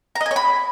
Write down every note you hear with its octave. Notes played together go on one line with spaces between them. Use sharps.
A#5
D#5
G#5
C#5
B5